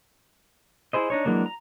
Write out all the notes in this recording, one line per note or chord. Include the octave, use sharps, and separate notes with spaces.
E4 G#4 C5 D#5
D4 D#4 C#5
E3 F#3 G#3 A#3 D4
A#5